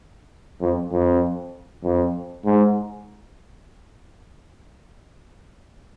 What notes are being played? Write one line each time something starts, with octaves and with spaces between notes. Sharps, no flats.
F2
F2
F2
G#2